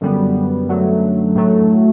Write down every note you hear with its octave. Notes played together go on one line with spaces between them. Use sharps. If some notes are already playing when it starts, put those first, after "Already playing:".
F#2 D3 G3 B3
F#2 D3 F#3 A3
A2 F#3 A3